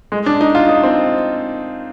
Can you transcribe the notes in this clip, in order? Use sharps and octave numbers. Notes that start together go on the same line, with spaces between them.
G#3
D4
D#4
F4
D#4
C4